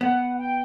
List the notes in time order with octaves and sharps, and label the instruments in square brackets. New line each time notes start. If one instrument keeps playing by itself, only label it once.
[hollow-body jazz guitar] B3 [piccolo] F#5
[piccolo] G5